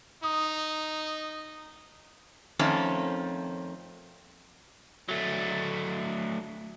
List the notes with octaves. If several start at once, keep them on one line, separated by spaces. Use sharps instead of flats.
D#4 D#6
F2 D#3 A3 C4 C#4
F#3 A3